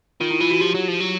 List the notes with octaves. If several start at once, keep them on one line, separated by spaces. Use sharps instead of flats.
D#3 F4
E4
E3 F4
F#4
F3 G4
F#3
F3
F#3